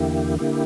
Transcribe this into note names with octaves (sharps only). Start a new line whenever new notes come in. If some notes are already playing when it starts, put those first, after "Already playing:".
Already playing: E2 D3 A#3 E4 G4
D3 A#3 E4 G4